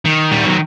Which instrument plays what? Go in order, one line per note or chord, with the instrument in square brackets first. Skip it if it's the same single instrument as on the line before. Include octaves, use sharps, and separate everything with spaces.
[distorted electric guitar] D#3
G3
F#3